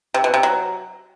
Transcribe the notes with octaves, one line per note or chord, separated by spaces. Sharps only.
C3
B2
C3
F#3